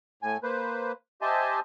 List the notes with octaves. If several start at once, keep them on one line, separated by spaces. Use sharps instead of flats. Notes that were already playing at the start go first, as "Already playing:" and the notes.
A2 G#5
A#3 B4 C5
G4 C5 D#5 E5 G#5 A5